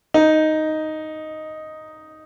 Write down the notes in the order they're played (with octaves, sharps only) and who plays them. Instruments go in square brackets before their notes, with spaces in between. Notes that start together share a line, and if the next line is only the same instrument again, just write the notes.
[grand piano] D#4